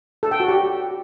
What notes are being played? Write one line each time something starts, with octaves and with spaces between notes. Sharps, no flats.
A4
G5
F#4
G4